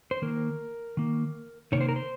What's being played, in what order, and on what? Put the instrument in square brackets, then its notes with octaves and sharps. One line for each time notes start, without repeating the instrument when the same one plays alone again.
[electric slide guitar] C5
D#3 A#3 A#4
D#3 A#3
C3 D#3 A#3 C#5
C5
A#4
C5